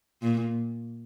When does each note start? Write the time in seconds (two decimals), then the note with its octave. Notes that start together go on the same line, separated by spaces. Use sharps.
0.22 A#2